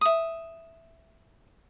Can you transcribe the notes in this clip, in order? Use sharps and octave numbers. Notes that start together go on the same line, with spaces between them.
E5 D#6